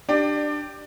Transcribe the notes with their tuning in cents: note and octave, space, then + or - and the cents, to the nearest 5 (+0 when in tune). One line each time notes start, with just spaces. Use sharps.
D4 +15 G4 +0 D5 +25